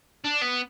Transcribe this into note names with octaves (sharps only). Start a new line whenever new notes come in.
D4
B3